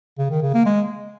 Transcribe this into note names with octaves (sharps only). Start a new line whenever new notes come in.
C#3
D#3
C#3
A#3
G#3